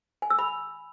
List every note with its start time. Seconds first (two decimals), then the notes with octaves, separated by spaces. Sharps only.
0.22 G#5
0.30 E6
0.39 B5